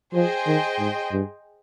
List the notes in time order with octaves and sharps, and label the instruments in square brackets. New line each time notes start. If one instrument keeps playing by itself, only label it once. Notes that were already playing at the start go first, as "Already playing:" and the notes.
[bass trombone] F3 [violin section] G#4 C5 D#5 G5
[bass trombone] D#3
G#2
G2